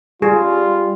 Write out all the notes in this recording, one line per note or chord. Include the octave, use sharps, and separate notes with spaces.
G3 F4 G#4